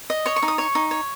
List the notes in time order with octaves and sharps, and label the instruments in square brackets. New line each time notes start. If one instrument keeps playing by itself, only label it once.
[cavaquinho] D#5
C#5 C#6
C#6
D#4
D#6
C#5 C#6
D#4
C#5